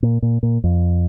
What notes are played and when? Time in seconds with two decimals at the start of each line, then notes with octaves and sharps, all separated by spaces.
0.03 A#2
0.22 A#2
0.43 A#2
0.64 F2